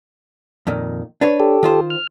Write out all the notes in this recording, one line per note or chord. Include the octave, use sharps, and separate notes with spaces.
F2 A#2 D#3
D4 B4 C#5
G4 A4
D#3 F4 C5
F6